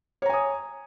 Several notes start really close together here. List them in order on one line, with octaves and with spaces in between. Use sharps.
C#5 A#5 G#5 D#6